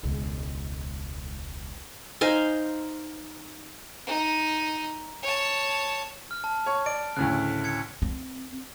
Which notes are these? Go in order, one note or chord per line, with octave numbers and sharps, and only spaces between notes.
E1 C#2
D#4 C5 F5 G#5
D#4
C#5 A5
F6
A5
C#5 C#6
D5 D7
D2 A2 C#3 F#6
G#6 C#7
C4